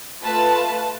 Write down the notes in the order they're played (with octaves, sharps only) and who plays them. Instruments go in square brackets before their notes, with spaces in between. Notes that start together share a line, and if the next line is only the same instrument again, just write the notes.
[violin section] A3 F4 B4 A5